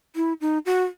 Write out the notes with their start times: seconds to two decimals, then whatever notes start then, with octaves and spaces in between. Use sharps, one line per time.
0.16 E4
0.41 D#4
0.66 F#4